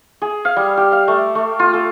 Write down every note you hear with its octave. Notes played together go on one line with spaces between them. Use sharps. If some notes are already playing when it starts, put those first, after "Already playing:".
G#4
F5
G3
G4
F5
A3
A3
F4
A4